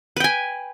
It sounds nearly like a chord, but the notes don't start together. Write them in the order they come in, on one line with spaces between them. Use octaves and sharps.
B4 G5 G#5